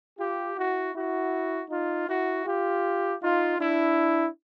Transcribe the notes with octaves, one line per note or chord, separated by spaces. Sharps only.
F4 G4
E4 F#4
E4 F#4
D#4 F4
E4 F#4
F4 G4
D#4 F4
D4 E4